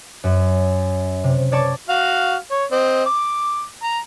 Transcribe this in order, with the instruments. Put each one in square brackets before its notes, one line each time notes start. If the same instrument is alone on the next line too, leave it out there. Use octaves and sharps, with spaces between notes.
[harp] F#2
C3
C#5 D5 A5 C#6
[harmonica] F#4 F5
C#5
C4 D#5
D6
A#5